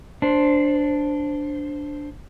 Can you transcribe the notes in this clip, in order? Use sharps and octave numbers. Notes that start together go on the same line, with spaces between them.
D4 C5